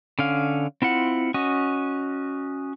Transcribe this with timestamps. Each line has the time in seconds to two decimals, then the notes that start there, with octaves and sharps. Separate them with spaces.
0.19 D3 C#4 F5
0.82 C4 E4 F4 F#5
1.34 C#4 F#4 D#5